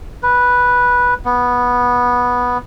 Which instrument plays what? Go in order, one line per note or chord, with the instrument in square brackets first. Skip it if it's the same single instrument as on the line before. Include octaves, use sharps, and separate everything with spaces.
[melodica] B4
B3